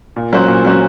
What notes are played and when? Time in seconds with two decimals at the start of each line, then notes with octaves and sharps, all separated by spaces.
0.16 A#2
0.33 F#3 C#4 F#4 C5
0.48 A#2
0.65 F#3 C#4 F#4 C5